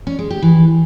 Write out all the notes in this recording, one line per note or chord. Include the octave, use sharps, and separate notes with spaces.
C#4
G#3
G4
E3